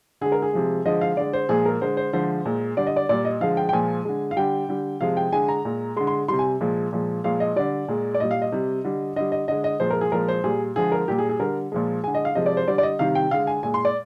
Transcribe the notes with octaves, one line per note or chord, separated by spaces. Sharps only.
D3 G#3 G#4
A#4
G#4
C3 F3 G#3
D3 F3 G#3 D#5
F5
D3 G#3 D5
C5
A#2 F3 G#3 G#4
A#4
D3 G#3 C5
C5
D3 F3 G#3 C5
A#2 G#3
D3 G3 D5
D#5
D5
A#2 G3 D5
D#5
D3 F3 G#3 F5
G5
G5
A#2 F3 G#3 G#5
D3 G#3
F5
D3 G3 G5
D3 G3
C3 F3 G#3 F5
G5
D3 G#3 G#5
A#5
A#2 G#3
D3 G#3 C6
C6
C3 G3 C6
G#5
A#2 F3 G#3
A#2 F3 G#3
A#2 F3 G#3 F5
D#5
D3 G3 D5
A#2 G#3
D5
A#2 G3 D#5
F5
D#5
C3 G3
D3 G3
D3 G3 D#5
D#5
D3 G#3 D#5
D#5
A#2 F3 G#3 C5
A#4
G#4
A#2 F3 G#3 A#4
C5
A#2 G3 G#4
D3 F3 G#3 G#4
A#4
A#2 G3 G4
G#4
G#4
D3 G3 A#4
A#2 F3 G#3
D3 G#3 G#5
D#5
F5
C3 F3 G#3 D#5
D5
C5
D3 G3 D5
D5
D#5
C3 D#3 G3 F5
G5
D3 G#3 F5
G#5
A#2 G#3 G#5
C6
D5